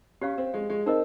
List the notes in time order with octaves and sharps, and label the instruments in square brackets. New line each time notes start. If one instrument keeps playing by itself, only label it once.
[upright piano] C#4 [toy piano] G4 C#5 F5
[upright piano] C4
G#3
G#3
[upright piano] C4 [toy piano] D#4 A#4 D#5